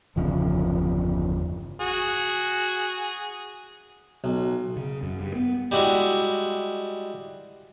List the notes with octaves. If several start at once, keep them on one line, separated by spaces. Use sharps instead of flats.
G1 E2 C#3 F3
F#4 G#4
B1
C#3
F#2
G2
B3
G3 G#3 E4 F#4